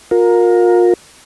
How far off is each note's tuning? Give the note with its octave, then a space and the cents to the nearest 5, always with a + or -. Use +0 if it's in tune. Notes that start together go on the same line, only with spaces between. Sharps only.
F4 +35 A#4 +0